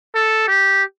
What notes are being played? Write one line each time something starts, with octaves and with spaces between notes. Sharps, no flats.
A4
G4